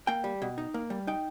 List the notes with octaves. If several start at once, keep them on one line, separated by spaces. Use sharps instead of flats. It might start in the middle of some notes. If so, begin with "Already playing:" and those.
A#3 G5
G3
B2
D#4
A#3
G3
D#4 G5